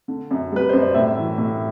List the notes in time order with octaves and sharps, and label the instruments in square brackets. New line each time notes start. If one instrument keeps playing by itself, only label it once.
[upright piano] D3
F#2
G3 B4
F#2 C5
D5
A2 E5
E3
A2